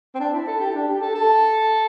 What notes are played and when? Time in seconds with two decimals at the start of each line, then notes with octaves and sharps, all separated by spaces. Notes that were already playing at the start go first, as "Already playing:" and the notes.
0.15 C4
0.20 D4
0.33 E4
0.47 A4
0.60 G4
0.74 D4
0.88 G4
1.01 A4
1.15 A4